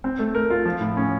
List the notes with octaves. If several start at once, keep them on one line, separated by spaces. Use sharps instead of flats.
C4
A3
A#4
F4
F3
A2
C#4